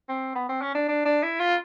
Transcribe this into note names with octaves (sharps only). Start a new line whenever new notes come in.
C4
B3
C4
C#4
D4
D4
D4
E4
F4